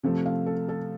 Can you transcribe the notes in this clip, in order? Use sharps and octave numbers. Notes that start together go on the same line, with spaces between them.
C3 F3 A3
F5
A4
A4